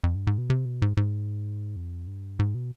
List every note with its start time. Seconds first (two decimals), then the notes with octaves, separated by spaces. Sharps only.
0.04 F2
0.15 G2
0.27 G#2
0.38 B2
0.50 C3
0.65 B2
0.82 G#2
0.97 G#2
1.76 F2
2.07 G2
2.39 G#2
2.55 B2